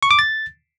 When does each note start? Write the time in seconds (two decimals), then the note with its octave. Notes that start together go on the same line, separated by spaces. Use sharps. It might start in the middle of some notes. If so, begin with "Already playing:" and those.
0.03 C#6
0.11 D6
0.19 A6